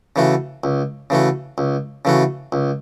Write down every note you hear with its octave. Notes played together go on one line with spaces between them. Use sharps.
C#3 E3 A3 F#4
C#2
C#3 E3 A3 F#4
C#2
C#3 E3 A3 F#4
C#2